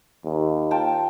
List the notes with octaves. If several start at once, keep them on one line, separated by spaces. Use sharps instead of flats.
D#2
F4 G5 A5